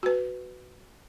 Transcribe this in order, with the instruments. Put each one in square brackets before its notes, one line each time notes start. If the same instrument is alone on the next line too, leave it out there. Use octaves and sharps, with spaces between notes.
[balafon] F#4 B4